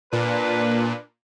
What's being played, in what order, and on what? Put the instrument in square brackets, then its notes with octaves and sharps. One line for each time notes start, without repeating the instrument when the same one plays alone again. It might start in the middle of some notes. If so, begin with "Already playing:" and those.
[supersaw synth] A#2 [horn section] D4 B4